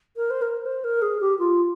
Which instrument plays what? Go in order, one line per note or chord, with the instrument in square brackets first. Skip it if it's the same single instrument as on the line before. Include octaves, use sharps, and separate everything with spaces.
[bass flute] A#4
C5
A#4
C5
A#4
G#4
G4
F4